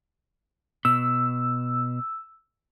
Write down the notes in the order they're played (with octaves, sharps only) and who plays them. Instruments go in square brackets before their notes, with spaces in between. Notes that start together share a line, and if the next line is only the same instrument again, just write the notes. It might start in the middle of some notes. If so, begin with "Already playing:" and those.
[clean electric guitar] B2 [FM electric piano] E6